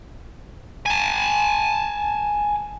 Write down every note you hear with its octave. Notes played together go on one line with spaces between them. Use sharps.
G#5 A5